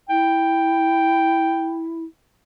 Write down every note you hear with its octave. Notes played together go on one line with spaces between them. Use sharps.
E4 G5